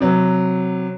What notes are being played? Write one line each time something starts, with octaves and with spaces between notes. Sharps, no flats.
C3 F#3